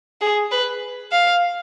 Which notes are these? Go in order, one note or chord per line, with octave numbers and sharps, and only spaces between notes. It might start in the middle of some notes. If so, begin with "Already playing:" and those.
G#4
B4
F5